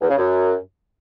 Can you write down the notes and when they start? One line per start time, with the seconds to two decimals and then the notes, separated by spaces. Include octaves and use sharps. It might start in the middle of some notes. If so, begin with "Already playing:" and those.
0.02 E2
0.10 C#3
0.17 F#2